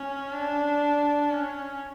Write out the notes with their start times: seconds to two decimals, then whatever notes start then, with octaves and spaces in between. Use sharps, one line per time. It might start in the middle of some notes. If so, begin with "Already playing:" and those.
Already playing: C#4
0.32 D4
1.31 C#4